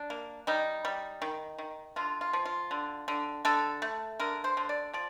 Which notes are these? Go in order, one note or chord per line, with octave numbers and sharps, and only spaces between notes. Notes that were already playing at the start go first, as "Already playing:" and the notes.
Already playing: D4
A#3
G3 D#4
G3
D#3
D#3
D3 F4
F4
F3
F4
D3
D3
D3 A4
A3
D3 A#4
C5
D3
D5
F3 D5